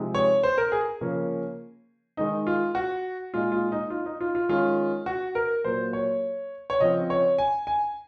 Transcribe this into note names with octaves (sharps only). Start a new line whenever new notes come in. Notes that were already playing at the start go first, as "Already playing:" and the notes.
Already playing: C3 F3 G#3 D#4
C#5
C5
A#4
G#4
C#3 F3 A#3 C#4
D#3 G#3 D#4
F4
F#4
A#2 G#3 D#4 F4
F4
D#4
F4
D#4
F4
F4
D#3 G#3 C#4 F4
F#4
A#4
A#2 F#3 A#3 C5
C#5
C#5
C#3 F3 C4 D#5
C#5
G#5
G#5